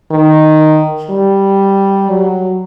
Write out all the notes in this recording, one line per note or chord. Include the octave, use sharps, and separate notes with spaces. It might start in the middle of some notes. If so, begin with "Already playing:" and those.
D#3
G3
F#3